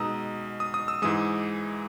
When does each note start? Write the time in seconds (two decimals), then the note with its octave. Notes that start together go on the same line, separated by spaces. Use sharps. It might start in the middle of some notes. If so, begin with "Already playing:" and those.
Already playing: B2 G#3 D#4 A#5 D#6 E6
0.60 D#6
0.74 D#6
0.88 E6
1.02 G#2 E3 G#3 D#6